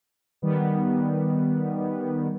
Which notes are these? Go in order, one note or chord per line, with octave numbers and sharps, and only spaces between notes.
D#3 G3 B3